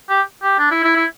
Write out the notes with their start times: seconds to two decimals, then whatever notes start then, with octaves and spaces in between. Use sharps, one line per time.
0.10 G4
0.43 G4
0.59 D4
0.71 E4
0.84 E4
0.96 E4